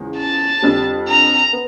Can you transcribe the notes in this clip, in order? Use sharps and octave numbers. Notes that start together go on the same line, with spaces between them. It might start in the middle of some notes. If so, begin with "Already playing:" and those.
Already playing: E2 C#3 F3 G#3
A5
F2 D3 G3
A#5
B3